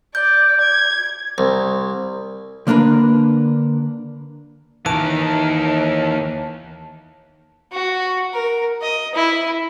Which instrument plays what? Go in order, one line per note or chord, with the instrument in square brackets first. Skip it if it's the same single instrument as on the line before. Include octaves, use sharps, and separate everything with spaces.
[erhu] D5 [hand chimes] G6
[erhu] G#6
[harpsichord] C2
[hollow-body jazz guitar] D3 A#3 D4 A#4 B4
[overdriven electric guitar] D#2 A#4 [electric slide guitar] D#3 E3 [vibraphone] A5
[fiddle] F#4
A#4
D#5
E4